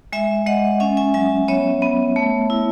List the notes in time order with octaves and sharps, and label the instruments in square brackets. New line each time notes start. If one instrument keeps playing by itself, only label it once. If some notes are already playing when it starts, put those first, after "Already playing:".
[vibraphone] G#3 E5 G#5
G#3 D#5 F#5
C#4 E5 G#5
E5 G#5
F#3 E5 G#5
B3 C#5 E5
B3
A3
E4